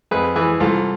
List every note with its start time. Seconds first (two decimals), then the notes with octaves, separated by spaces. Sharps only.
0.11 F2 G#4 B4
0.35 E3 G#4 B4
0.60 C2 F4 A4